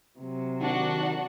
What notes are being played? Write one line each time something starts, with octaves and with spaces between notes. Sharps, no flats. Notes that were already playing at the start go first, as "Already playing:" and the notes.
C3 F#3
D#3 D4 F#4 F#5